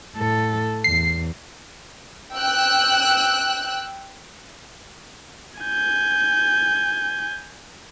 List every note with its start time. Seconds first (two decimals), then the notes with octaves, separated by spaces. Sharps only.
0.17 A2 A4
0.84 E2 C7
2.35 G5 E6 F#6
5.61 G#5 G6